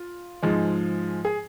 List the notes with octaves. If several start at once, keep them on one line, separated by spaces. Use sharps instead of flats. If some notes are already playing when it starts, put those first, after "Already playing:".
Already playing: F4
G#2 F3 G#3
G#4